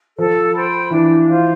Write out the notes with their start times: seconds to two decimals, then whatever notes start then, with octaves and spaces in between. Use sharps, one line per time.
0.18 F3 A4
0.54 C5 G5 B5
0.91 E3 D4
1.28 F4 C5 F5